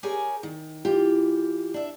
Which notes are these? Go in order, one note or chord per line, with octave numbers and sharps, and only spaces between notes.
G4 G#4 A#4 C#5 G#5
D#3
E3 F4 G4
D4 E5